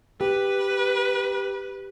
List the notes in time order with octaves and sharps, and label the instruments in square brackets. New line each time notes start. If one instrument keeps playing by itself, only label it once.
[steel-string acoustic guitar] G4 [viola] B4